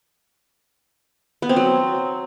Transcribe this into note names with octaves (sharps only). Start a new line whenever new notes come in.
B3
C4
F#3